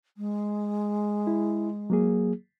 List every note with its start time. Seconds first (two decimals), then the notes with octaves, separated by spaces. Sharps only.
0.17 G#3
1.27 E4
1.90 F#3 A#3 G#4